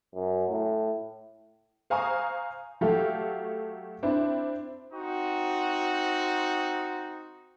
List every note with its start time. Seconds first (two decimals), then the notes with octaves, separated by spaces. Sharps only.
0.14 F#2
0.50 A2
1.90 C5 F5 G#5 A#5 C#6 D#6
2.81 F#3 A3 G4 A4 F5
4.03 C4 D4 E4
4.92 C4 D#4 F#4